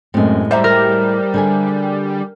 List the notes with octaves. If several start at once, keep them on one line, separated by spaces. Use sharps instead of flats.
F#2 A2 G#3 C4
G3 C5 E5 A#5
A#4
D3 G#4 G#5